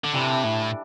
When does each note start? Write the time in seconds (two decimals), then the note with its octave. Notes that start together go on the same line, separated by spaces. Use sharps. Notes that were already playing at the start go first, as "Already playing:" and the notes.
0.04 D3
0.14 C3 E3 G3 D4 A4
0.44 A2